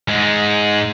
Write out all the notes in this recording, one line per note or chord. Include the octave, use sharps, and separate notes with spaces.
G#2 G#3